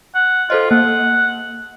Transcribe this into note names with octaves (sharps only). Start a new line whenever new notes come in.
F#5
F4 A4 C5 D#5
A#3 F#5